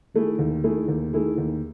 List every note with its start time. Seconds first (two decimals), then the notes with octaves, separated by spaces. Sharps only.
0.14 D#3 A3 E4 G#4
0.39 D#2
0.64 D#3 A3 E4 G#4
0.88 D#2
1.13 D#3 A3 E4 G#4
1.38 D#2